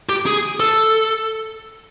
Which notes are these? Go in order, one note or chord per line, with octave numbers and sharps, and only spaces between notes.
G4
G#4
A4